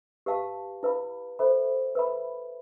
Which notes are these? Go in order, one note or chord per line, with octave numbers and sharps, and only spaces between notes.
G4 B4 F5 A5
E4 B4 F5 B5
A4 C5 E5 B5
B4 E5 B5